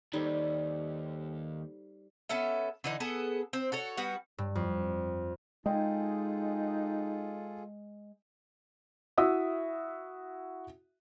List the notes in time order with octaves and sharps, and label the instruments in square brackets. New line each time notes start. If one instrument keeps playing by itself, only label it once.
[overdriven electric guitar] D#2 [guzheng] G3 [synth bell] D#4 A4 C5
[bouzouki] B3 C#4 A4 E5
D3 E3 D#4
B3 G#4 A4
C4 C5
F#4 A4 C#5
G3 B3 F#4
[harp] G2
F2
[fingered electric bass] G#3 [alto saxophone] D#4 [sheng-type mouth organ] F4 G#4 A4 [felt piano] D#5 G5
[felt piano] E4 F#4 E5 D#6 E6